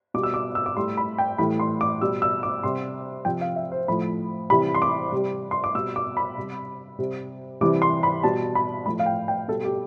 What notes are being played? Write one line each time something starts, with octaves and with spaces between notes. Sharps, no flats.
B2 G3 D6
E6
D6
E6
D6
A2 G3 C6
B5
G5
A2 E3 G3 B5
C6
D6
B2 G3 E6
E6
D6
C3 G3 C6
C3 F3 G5
F5
E5
C5
A2 F3 B5
C3 E3 G3 B5
C6
D6
C3 G3
C6
D6
B2 G3 E6
D6
B5
C3 G3
C3 G3
C3 E3 G3 D6
C6
B5
B2 G3 A5
B5
A2 F3 B5
F5
G5
G5
B2 G3 A4
G4